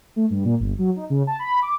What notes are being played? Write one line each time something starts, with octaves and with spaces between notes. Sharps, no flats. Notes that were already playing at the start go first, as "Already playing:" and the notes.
A3
G2
A#2
G1
F#3
D#4
C#3
A5
B5
D6